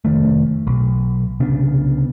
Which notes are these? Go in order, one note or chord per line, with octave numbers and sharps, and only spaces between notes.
F1 C#2 D#3 A3
B1
C2 C#3 B3 D4